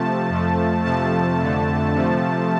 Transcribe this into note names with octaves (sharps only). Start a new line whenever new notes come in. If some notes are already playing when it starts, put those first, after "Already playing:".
Already playing: C3 F3 A3 A5
F2 F3 A3
F2 C3 F3 A3 A5
F2 D3 A3
C3 F3 A3